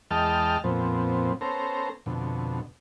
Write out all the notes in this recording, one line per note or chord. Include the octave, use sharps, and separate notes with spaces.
E2 G#3 D#5 G5 A5 F6
F2 A#2 F3 B3 C4
B3 C#4 A4 C5 A#5
F2 B2 D3